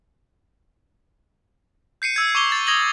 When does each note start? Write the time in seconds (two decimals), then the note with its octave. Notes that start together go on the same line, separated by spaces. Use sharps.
2.02 G6 C7 C#7 D#7
2.16 E6 G#6
2.35 C#6 D6 F7 G7
2.52 A6
2.67 D#6 G#6 A#6 F#7 G7